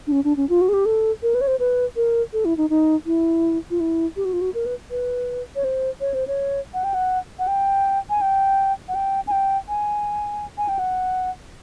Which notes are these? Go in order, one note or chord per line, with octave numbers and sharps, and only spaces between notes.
D4
C#4
D4
C#4
F4
F#4
G#4
G4
A4
A#4
B4
C#5
C5
B4
A#4
A4
E4
D#4
D#4
E4
F4
E4
G4
F#4
F4
F#4
A#4
B4
B4
C#5
C5
C#5
C5
C#5
F#5
G5
F#5
F#5
G5
G#5
G5
F#5
G5
G#5
G5
G#5
G#5
G5
F#5